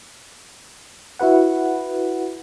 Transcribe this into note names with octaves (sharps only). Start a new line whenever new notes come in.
E4 F#4 B4 F#5